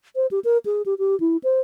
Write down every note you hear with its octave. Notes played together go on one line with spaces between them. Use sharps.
C5
G4
A#4
G#4
G4
G4
E4
C5